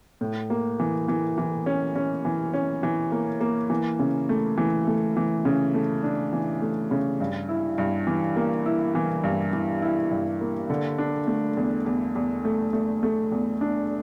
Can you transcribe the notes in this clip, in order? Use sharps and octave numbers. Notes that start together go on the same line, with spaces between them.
A2
A#3
E3
E3
E3
C#4
C#4
E3
C#4
E3
A#3
A#3
E3
C#3
A3
E3
A3
E3
C#3
A3
D4
E3
A3
C#3
G2
E4
G2
E3
A#3
E4
E3
G2
E3
E4
G2
A#3
D3
D4
A3
E2
E2
E2
A3
A3
A3
E2
D4